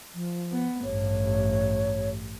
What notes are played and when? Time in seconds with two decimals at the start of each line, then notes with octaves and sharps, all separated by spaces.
0.15 F3
0.52 B3
0.84 A1 G2 C#5